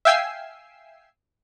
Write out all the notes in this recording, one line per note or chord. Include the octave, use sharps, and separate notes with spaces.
E5 F5 G5 G#5 E6 C7